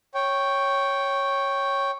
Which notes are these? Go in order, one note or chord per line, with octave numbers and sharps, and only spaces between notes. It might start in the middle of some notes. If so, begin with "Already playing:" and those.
C#5 G5